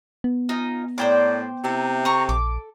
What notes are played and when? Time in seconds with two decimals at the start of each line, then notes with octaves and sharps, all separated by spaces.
0.24 B3
0.49 D#4 F4 G#5
0.98 A2 D4 A#4 C5 D5 G5 D6
1.64 C3 A#3 D#4 E4
2.05 A4 A#5 C#6
2.29 A#1 D6